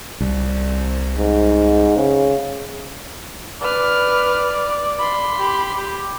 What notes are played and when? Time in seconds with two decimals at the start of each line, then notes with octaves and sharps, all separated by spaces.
0.20 C2
1.17 G#2
1.96 C#3
3.61 B4 D5 F6
4.99 B5 C6
5.39 G4
5.77 G4